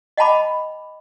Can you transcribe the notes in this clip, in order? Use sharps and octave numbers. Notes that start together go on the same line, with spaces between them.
D#5 F#5 G5 A5 B5 D6